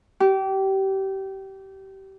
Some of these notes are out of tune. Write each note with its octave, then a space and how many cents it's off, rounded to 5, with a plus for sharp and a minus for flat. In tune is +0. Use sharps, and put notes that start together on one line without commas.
G4 -25